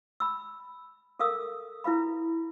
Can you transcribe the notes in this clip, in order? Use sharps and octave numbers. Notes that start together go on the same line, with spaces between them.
B5 E6
A4 A#4 F5 D#6 E6
E4 B4 F5 B5